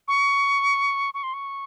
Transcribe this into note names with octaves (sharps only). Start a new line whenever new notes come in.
C#6
C#6
C6
C#6